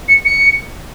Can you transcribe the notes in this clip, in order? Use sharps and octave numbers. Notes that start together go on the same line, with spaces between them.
C#7
C#7